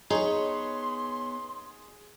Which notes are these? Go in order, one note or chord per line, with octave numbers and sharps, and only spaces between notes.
B3 D#4 G#4 C#5 C6